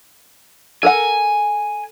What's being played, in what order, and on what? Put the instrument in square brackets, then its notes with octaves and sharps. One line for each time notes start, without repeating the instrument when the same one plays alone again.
[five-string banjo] A4 A#4 F#5 [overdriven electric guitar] G#5